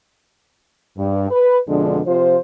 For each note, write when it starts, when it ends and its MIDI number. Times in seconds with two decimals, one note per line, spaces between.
0.98 1.29 43
1.30 1.56 71
1.67 2.00 41
1.67 2.00 47
1.67 2.00 50
1.67 2.00 53
1.67 2.00 56
1.67 2.00 62
2.05 2.37 48
2.05 2.37 53
2.05 2.37 65
2.05 2.37 72